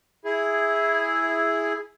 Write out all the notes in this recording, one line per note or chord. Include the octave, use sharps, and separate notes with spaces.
E4 G#4